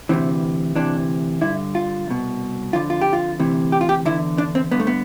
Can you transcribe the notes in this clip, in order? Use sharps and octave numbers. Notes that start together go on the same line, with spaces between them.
D2 C3 E3 C4
D2 C3 E3 D4
G2 D3 E4
F4
C2 B2
F2 D3 F4
F4
G4
F4
D2 C3 E3
G4
F4
G4
E2 D3 E4
D4
C4
G2 D3 B3
A3
B3